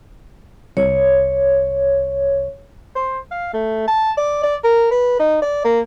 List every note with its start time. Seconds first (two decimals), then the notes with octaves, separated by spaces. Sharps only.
0.77 C2 C#5
2.95 C5
3.31 F5
3.54 A3
3.88 A5
4.17 D5
4.43 D5
4.64 A#4
4.91 B4
5.20 D#4
5.42 D5
5.65 A#3